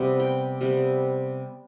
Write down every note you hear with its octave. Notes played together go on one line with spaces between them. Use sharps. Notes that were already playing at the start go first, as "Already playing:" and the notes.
Already playing: C3 G3 B3
G5
C3 G3 B3